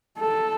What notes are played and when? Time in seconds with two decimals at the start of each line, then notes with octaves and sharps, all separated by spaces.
0.19 A4